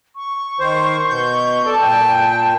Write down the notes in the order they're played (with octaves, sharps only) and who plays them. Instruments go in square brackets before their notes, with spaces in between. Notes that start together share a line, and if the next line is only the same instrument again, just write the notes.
[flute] C#6
[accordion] D#3 C5
B2 G6
[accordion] A4 D5 [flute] A5
[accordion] A#2 G5